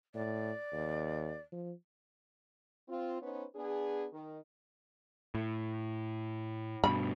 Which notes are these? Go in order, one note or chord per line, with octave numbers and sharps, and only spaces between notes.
A2 D5
D#2
F3
C4 F4
B3 C#4 D#4 B4 C5
B3 D4 G#4
D#3
A2
G2 B2 B5